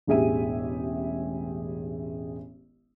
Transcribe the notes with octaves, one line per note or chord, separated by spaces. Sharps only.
E1 A1 G4 G#4 E5 D#7